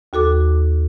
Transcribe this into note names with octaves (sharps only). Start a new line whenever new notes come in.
D#2 F#4 A4 D6